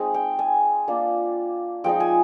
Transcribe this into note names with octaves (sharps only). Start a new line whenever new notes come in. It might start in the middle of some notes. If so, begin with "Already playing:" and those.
Already playing: G#3 C4 D#4
G5
G#5
A#3 D4 F4
F3 G#3 C4 D#4 G5
G#5